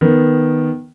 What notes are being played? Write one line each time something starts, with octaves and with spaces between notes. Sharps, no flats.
D#3 B3